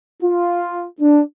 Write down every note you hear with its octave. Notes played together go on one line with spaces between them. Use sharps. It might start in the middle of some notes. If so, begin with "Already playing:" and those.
F4
D4